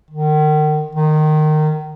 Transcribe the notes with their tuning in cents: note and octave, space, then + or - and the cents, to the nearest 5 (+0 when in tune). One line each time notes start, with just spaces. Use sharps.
D#3 -35
D#3 -20